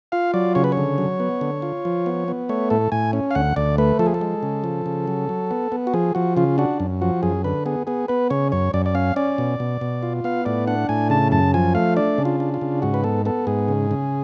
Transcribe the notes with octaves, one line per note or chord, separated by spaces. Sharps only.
F4 F5
F#3 D5
C#3 C#5
B4
C#5
D3
F#3
B3
D3
F4
F3
B3
B3
A3 C#5
A2 A4
A2 G#5
C#4
F5
D2 F#5
D2 D5
A3 B4
F3 A4
G#4
A4
G#3
C#3
F3
C#3
F#3
F#3
B3
B3
F#4
F3 G#4
F3 F#4
C#3 F4
D4 F#4
F#2
F3 F#4
F#2 G#4
D3 B4
B3 G#4
B3 G#4
B3 B4
C#3 C#5
F#2 C#5
F#2 D5
D5
C#4 F5
C#4 D5
B2
B2
B2
F4
B3 F5
A2 D5
D4 F#5
A2 G#5
C#3 A5
F#2 A5
F3 G#5
A3 F5
D4 D5
C#3
F4
D4
F4
C#3
G#2 F#4
B4
B3 A4
B3 A4
G#2 G#4
C#3
C#3